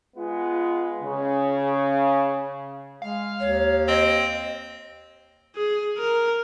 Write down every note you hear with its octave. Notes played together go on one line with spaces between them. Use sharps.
G#3 B3 F4
C#3
G#3 F5
D#2 C#5
C4 D#5
G#4
A#4